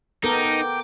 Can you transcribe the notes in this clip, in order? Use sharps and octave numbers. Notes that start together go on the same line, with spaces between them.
B3 D#4 A4 A#4 G5 D6